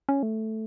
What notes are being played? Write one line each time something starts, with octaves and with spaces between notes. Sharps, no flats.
C#4
A3